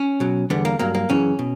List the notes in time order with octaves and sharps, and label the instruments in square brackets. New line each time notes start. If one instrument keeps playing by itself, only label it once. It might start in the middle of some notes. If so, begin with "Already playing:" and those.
Already playing: [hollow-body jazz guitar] C#4
B2 F#3
E2 D3 G3 B3
A#3
G2 F#3 A#3
A#3
F#2 C#3 E3 C#4
B2